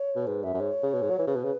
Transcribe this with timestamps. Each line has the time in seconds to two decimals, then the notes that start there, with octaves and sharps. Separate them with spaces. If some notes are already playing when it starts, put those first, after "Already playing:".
Already playing: C#5
0.16 B2
0.27 G#2 B4
0.43 F#2 E5
0.54 F#2
0.60 G#2 C#5
0.83 C#3
0.94 B2
1.02 G#2
1.10 F#3
1.19 E3
1.27 C#3 B4
1.36 B2
1.44 C#3